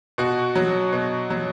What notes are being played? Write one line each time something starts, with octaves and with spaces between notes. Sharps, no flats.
B2 F#4
F#3
B2
F#3